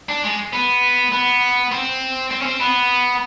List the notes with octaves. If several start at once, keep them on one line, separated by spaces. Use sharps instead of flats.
D4
G#3
B3
B3
C4
C4
C#4
C4
B3